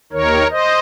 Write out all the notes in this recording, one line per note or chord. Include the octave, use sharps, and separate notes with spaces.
D#2 D#3 A#4 C#5
C5 D#5